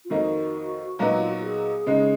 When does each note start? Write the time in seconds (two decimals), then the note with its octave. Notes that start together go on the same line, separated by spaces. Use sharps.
0.05 F4
0.10 F2 D#3 A#3 D#4 F#4
0.99 A#2 F#3 B3 D#4
1.19 F4
1.31 F#4
1.43 G#4
1.86 C#3 G#3 D#4